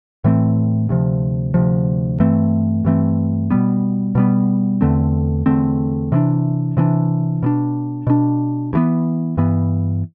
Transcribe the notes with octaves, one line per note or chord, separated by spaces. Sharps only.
A2 E3 A3 C4
D2 C3 F3
D2 C3 F3
G2 E3 A3 C4
G2 E3 A3 C4
B2 G3 B3
B2 G3 B3
E2 D3 A3 C4
E2 D3 A3 C4
C3 E3 B3 D4
C3 E3 B3 D4
B2 B3 D4
B2 B3 D4
G2 E3 B3
G2 E3 B3